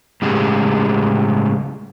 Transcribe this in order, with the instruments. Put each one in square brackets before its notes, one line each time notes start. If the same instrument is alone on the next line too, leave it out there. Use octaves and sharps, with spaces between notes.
[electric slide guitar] A2 C#3 G3 G#3